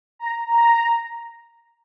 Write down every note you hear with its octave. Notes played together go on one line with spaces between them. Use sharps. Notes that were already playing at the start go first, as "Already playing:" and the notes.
A#5
A#5